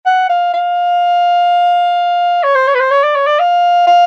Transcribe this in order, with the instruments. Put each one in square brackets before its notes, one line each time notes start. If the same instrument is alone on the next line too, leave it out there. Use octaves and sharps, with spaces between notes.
[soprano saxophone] F#5
F5
F5
C#5
C5
C#5
B4
C5
C#5
D5
C#5
D5
F5
F5